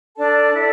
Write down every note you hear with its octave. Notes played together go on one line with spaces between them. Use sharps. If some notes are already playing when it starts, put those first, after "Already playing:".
D4 A4 D5 A5
E4 A4 D5